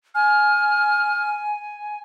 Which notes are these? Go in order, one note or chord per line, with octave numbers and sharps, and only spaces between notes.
G#5 F6